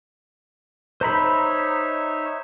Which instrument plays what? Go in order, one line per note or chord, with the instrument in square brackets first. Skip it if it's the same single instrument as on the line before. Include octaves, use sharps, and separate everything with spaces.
[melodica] D#4 C#5 E5 [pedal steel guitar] C5 A#5 B5